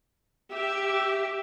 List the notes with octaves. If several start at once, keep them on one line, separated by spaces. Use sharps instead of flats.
G4 E5